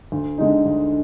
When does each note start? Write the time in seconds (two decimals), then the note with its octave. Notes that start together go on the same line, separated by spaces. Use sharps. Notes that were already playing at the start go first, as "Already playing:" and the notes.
0.12 D2
0.38 D3 G#3 D#4
0.65 D2